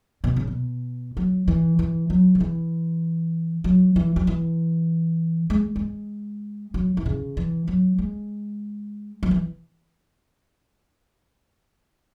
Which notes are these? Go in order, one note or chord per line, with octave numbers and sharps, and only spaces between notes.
B2
C#3
B2
F#3
E3
E3
F#3
C#3
E3
F#3
E3
F#3
E3
G#3
G#3
F#3
E3
C#3
E3
F#3
G#3
F#3
E3